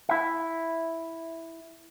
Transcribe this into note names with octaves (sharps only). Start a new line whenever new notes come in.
E4 E5